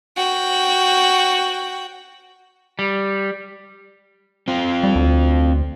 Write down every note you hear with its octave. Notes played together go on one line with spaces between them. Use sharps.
F#4 G5
G3
C4 F4
G3
D2